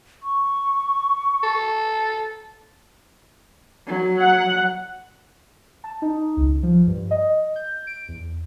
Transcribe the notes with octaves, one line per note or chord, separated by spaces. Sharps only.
C#6
A4
F#3
F#5
A5
D#4
C#2
F3
G2
D#5
G6
D7
E2